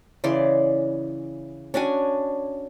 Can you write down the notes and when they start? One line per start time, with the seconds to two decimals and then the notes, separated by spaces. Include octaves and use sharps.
0.24 C#3 E3 D5 C6
1.74 C#4 D4 F#4 G#5